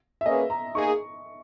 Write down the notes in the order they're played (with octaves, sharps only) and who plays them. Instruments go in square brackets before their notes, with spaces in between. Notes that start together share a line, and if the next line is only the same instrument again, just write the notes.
[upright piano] E5
[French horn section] A#3 C#4 G#4 B4 [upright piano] D#5
[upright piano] A#5
[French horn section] A#3 D#4 G#4 [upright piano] C#6